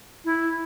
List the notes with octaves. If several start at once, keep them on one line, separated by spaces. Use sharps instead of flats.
E4